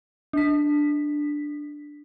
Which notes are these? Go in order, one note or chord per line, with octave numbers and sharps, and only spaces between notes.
D4 B6